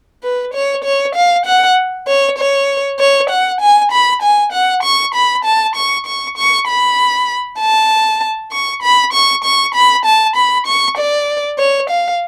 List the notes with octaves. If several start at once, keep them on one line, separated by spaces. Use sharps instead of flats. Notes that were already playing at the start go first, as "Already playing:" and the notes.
B4
C#5
C#5
F5
F#5
C#5
C#5
C#5
F#5
G#5
B5
G#5
F#5
C#6
B5
A5
C#6
C#6
C#6
B5
A5
C#6
B5
C#6
C#6
B5
A5
B5
C#6
D5
C#5
F5